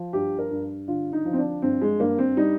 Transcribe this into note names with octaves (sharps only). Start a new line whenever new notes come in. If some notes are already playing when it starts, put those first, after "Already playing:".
Already playing: F3
G2 G4
A#4
G2
D3 F4
D#4
F3
C4
D4
G2 C4
G#3
G2 A#3
C4
G3 D#4